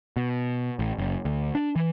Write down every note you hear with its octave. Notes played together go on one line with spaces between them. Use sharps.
B2
A1
F#1
D2
D4
E3